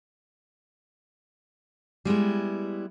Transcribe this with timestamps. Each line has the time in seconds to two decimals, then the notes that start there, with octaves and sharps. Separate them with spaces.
2.05 G3 G#3 B3 E4